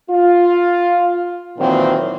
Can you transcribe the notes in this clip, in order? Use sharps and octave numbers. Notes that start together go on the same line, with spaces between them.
F4
A#2 D#3 E3 F#3 C4